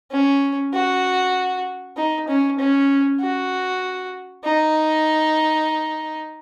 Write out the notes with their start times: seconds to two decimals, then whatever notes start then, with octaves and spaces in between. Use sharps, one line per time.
0.11 C#4
0.73 F#4
1.97 D#4
2.28 C#4
2.59 C#4
3.21 F#4
4.44 D#4